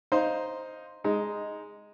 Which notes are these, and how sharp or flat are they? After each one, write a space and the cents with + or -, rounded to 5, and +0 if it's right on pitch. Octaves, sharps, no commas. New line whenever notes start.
D#4 +0 C5 +0 F5 +0
G#3 +0 D#4 +5